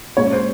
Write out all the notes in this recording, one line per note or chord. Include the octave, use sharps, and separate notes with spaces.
A#2 G#3 C#4 C#5
C5